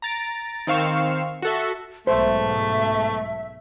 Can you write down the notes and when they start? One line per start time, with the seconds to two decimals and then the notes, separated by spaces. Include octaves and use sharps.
0.02 A#5 A6 D7
0.67 D#3 C4 F5 C#6 E7
1.42 F#4 A4 E5
2.07 B1 G#2 A3 C5 E5